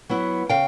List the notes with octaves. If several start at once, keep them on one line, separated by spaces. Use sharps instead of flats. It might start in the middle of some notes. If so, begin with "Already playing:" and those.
F#3 B3 E4
C#3 F5 G5